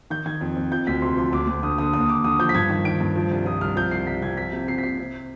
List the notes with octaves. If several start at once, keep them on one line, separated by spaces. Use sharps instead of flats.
D#3 G6
D#3 G#6
F2
F2
F3 G6
D2 B6
C3 C6
F3 C6
D2 D6
D2
D3 D#6
D3 D#6
D#2 D#6
D#2 D6
D3 D#6
F3 G6
B6
G2 G#6
D#3
D#3 D7
G2
F3
C2
F3 D#6
C2 F6
F3 G6
C2 C7
C2 B6
C2 G#6
F3 B6
C3
C3 C7
B6
C3 C7
C3